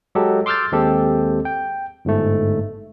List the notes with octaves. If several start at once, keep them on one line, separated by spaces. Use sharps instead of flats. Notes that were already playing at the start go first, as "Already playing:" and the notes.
F#3 G#3 G4 A4
C6 D6 E6 F6 G6 A6
D#2 G#3 C4 G4 A4
G5
G1 G#2 A3